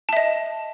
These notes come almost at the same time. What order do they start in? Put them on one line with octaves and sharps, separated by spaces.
A5 E5 D#5